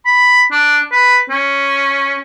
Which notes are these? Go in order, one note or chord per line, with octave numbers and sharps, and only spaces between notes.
B5
D4
B4
C#4